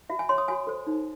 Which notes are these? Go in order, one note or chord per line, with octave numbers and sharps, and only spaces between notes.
F#4 E5
G#5
C#5 C6
D#6
F#4 G#5
A4 C5
D#4